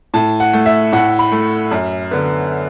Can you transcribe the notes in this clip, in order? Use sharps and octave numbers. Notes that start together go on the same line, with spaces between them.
A2 A5
F#5
A3
E5
A2 F#5
B5
A3
F#2
D3 B3